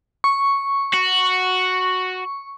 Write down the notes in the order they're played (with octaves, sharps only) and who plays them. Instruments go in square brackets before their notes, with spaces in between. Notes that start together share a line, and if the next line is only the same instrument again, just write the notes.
[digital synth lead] C#6
[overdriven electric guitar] F#4